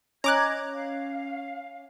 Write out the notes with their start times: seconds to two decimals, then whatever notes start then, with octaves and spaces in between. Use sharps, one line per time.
0.24 C#4 D#5 A#5 D6 F#6 G#6
0.73 F5